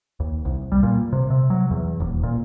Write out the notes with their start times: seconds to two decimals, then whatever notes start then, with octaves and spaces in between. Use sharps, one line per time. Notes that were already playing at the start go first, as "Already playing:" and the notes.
0.20 D#2
0.45 C2
0.72 G3
0.83 A#2
1.13 C3
1.30 C3
1.50 F#3
1.71 E2
2.00 D#1
2.23 A#2